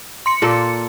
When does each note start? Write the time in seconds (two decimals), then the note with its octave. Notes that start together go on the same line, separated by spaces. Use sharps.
0.26 C6 C#7
0.42 A#2 A#3 A4